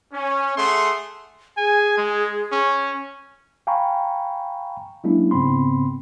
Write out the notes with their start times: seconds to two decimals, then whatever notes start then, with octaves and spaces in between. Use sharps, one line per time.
0.12 C#4
0.57 A3 G#4 F#5 C6
1.58 G#4 G#5
1.98 G#3
2.52 C#4
3.67 F5 G5 G#5 A#5 B5 C#6
5.04 F#3 G#3 A#3 C#4 D4 E4
5.31 G#2 C#3 B3 C4 B5 C6